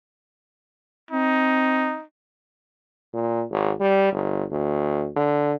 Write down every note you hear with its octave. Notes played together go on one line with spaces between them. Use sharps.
C4 D#4
A#2
G#1
G3
G1
D2
D3